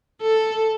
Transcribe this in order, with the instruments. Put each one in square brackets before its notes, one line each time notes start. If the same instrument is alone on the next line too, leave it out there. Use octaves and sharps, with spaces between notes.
[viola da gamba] A4